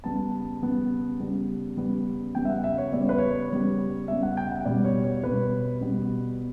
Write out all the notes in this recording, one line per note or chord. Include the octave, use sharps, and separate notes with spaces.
C#3 G3 B3 A5
C#3 G3 B3
C#3 G3 B3
C#3 G3 B3
C#3 G3 B3 G5
E5
F#5
E5
C#5
C#3 G3 B3 D5
C#5
B4
C#5
C#3 G3 B3
C#3 G3 B3 E5
F#5
G5
F#5
B2 G3 B3 D5
C#5
C#5
B2 G3 B3 B4
B2 G3 B3